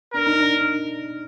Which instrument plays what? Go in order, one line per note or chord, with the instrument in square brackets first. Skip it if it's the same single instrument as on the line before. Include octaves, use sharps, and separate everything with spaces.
[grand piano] D4 [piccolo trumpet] A#4
[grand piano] D#4
D4